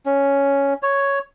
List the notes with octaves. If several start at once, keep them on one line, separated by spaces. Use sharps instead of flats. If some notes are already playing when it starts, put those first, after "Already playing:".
C#4
C#5